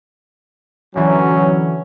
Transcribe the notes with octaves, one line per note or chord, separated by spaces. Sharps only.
D3 E3 F#3 C#4